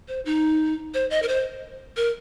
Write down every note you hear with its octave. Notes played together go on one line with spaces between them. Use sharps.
C5
D#4
C5
D#5
A#4
C5
A#4